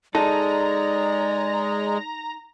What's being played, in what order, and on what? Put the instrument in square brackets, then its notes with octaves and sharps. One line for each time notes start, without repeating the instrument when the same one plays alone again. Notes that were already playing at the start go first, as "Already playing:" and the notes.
[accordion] G#3 [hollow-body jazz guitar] D#4 A4 [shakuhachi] D5 [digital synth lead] A#5